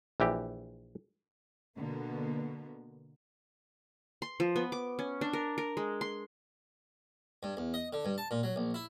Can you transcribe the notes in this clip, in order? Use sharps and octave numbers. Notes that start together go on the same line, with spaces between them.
A#1 E3 G4
B2 D3 A#3 B3
C6
F3
B3
D6
C#4
D4
A#4
A#4
G#3
C6
G2
E2
D#5
D3
G2
A5
A#2
F#3
A#1
E4